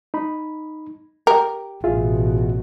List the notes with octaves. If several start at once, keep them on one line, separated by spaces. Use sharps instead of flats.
D#4 B5
G4 A#4
A1 B2 F4 G#4 E5